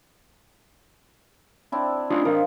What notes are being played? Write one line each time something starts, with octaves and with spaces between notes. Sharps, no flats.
C4 D4 E4
C#4 D4 F4 D#5
F3 D4 A#4